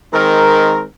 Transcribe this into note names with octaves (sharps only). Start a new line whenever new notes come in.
D#3 G#3 C4 A#4